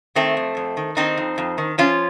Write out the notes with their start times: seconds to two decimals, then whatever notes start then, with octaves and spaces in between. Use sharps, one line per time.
0.15 D#3 A3 C4
0.37 F2
0.57 F2
0.77 D#3
0.97 D#3 C4 D#4
1.17 F2
1.38 F2
1.58 D#3
1.78 F3 C#4 F4